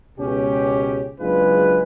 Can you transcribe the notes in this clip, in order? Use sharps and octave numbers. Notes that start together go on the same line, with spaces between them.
C#2 B2 C#4 G4
F#1 F#2 G#3 D4 F4 B4